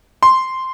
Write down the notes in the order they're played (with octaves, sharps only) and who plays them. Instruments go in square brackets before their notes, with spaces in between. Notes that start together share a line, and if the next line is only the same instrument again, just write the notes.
[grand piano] C6